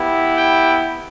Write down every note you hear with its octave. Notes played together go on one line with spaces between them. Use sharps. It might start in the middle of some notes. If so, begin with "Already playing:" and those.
Already playing: B3 E4 G4
G5